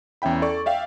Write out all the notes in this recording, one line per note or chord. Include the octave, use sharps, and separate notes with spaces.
E2 C#4 E5 G5 B5
A4 D5 C#6
D5 E5 F5 G5